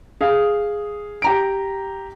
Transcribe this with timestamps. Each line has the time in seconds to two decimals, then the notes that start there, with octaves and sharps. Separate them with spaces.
0.21 G#4 F5
1.22 G4 A#5 D7